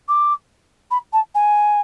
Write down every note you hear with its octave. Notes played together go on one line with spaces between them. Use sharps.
D6
B5
A5
G#5